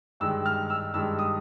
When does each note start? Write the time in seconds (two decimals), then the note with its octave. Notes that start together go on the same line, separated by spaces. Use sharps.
0.20 G2 D#3 G#3 E6
0.46 F6
0.70 E6
0.94 G2 D#3 G#3 E6
1.19 D#6